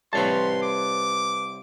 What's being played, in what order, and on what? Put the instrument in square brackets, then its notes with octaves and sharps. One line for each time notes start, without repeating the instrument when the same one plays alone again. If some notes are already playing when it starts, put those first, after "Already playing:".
[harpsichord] C2 C4 F5 [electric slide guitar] B4 C#5 A5 [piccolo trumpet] C6
[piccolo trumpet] D6